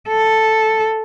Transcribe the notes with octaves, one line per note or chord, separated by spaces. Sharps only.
A4